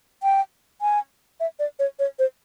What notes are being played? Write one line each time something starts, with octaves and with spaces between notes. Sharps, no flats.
G5
G#5
E5
D5
C#5
C#5
C5